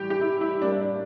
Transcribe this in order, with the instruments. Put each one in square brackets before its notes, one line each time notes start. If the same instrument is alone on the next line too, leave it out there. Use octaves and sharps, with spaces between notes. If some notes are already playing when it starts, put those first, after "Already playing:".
Already playing: [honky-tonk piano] A2 E3 G3 G4
G4
E4
E4
A2 G3 A#3 D4
D4
D4